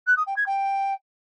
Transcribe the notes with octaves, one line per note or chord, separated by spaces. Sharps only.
F#6
D#6
G5
G#6
G5